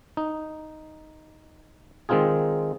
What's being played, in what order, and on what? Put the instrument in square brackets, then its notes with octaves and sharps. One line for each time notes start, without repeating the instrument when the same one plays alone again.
[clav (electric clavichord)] D#4
D#3 G#3 C4 D#4 F4 G#4